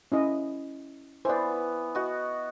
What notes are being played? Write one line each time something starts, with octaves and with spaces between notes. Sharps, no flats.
C#4 E4 D#5
E3 B3 C5 D5
F#4 D#5